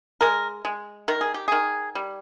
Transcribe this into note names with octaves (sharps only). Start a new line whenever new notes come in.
G#3 A#4
G#3
D#3 A#4
G#4
G4
D#3 G#4
G3